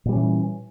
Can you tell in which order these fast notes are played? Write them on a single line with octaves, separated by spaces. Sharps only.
A#2 G3 C#4 E3